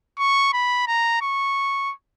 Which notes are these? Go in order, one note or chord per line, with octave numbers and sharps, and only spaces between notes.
C#6
B5
A#5
C#6